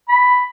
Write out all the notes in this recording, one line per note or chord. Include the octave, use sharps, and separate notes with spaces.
B5